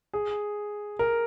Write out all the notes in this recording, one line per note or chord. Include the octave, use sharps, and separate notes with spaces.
G#4
A#4